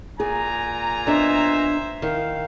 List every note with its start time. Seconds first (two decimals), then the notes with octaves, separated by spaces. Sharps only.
0.20 A#2 G#4 G#5 A#5
1.07 B3 D4 C5 D#5 E5
2.02 D#3 F5